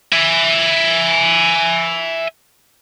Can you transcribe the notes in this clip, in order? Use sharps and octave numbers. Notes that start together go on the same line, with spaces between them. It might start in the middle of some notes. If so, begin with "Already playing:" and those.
E5 G#5